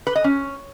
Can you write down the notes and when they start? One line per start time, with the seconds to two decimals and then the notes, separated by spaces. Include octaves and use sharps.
0.07 B4
0.15 D#5
0.24 C#4